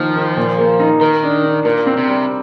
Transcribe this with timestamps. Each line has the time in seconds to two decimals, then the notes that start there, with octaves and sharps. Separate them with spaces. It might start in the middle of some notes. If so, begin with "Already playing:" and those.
Already playing: D#3 F3 A#3
0.16 D#3
0.37 A#2
0.58 A#3
0.80 D#4
1.01 D#3 A#4
1.23 D4
1.44 D4
1.65 A#2 A#4
1.86 C4
1.97 C3
2.08 G3